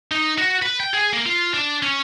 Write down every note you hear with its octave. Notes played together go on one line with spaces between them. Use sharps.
D#4
F#4
B4
G5
G#4
A#3
F4
D4
C#4